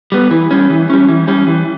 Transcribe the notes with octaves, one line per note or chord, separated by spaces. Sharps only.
G3 B3
E3
G3 C#4
E3
G3 C#4
E3
G3 C#4
E3